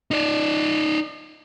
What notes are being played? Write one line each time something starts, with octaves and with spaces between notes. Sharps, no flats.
D#4 D5